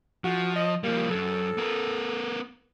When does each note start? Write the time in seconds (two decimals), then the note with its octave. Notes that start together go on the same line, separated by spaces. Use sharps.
0.24 F3 F#4
0.56 D#5
0.83 F3 G3 A#3
1.11 F#2 F#3 A4
1.58 B3 A#4